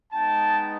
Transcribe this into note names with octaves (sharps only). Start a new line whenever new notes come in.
G#3 B3 D#4 G5 A5